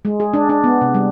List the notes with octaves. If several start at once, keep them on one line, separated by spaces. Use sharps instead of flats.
G#3
G#4
D4
D4
B3
C3
G3